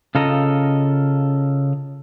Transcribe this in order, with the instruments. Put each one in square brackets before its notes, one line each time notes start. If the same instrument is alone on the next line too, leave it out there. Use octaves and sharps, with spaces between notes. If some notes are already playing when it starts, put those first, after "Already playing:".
[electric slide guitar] C#3 F4 A4 D#5 A#5